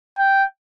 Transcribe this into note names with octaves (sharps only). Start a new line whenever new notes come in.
G5